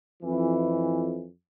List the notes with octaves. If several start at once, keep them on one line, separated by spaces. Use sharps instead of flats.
F2 E3